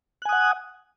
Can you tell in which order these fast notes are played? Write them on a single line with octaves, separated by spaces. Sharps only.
F#6 G#5 D#6 F#5